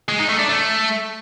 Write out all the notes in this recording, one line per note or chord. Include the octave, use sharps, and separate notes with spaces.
G#3
D#4
A3
D4
A3